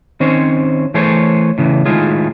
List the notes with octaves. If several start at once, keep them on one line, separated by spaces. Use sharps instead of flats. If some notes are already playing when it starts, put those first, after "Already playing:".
D#3 C4 C#4 C5 C#5
E3 A3 G#4 C5 C#5
A2 C#3 E3
A2 D#3 G#3 A3 F4 G#4